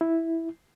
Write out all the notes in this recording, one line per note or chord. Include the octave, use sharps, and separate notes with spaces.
E4